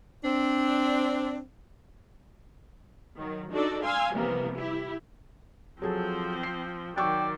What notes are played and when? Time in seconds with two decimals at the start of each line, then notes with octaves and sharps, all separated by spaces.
0.25 C4 D4
3.16 D#3 F#3
3.51 D4 D#4 F#4 A4 D5
3.83 F5 G#5 C6 E6
4.14 C3 E3 F3 G3 A#3 B3
4.56 E4 G4
5.82 F3 F#3 C4 G#4 A4
6.43 C7
6.97 D#3 F#3 D5 G5 C#6 E6